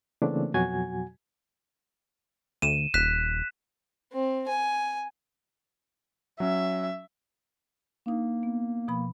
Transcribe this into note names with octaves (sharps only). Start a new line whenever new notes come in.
C#3 E3 A3 A#3 C4 D4
F2 B2 F#3 F#4 G#5 G#6
D2 D#7 E7
D#1 F#6 B6 E7
C4
G#5
F#3 C#4 E5
A#3 D4 D#4
B3
B2 F3 B5